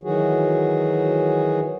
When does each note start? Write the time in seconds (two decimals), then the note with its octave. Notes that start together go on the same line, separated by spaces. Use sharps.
0.04 D#3 E3 F#3 F#4 G#4